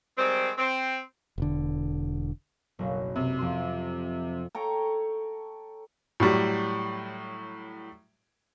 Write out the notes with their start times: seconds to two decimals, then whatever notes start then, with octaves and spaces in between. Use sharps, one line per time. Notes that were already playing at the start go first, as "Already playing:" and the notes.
0.17 D#3 G3 G#3 C4
0.57 C4
1.38 E1 D3
2.79 F#1 B1
3.16 C3
3.39 F2 C6
4.55 A4 C#5 G5 A#5
6.20 A2 F#3 G3